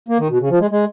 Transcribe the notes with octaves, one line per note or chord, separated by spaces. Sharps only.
A#3
D#3
B2
C#3
F3
G#3
G#3